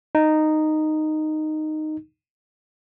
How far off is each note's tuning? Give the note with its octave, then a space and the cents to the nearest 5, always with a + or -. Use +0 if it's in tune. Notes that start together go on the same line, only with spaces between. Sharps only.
D#4 -10